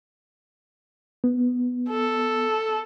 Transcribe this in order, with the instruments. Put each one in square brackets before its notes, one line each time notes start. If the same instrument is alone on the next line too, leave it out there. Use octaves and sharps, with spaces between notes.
[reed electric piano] B3
[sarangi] A4